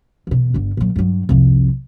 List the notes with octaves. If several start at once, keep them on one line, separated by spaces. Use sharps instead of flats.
E2 B2
G1 D3
A#2 F#3
G2 F#3
C2 F2